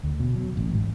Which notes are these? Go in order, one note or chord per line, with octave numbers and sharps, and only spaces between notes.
D2
B2
F#3
A1
G#2